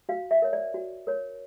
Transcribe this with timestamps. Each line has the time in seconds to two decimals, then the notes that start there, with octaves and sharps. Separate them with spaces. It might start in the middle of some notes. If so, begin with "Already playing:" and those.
0.09 F#4 F5
0.31 E5
0.42 A#4 C#5
0.53 D5
0.74 F#4
1.07 A#4 C#5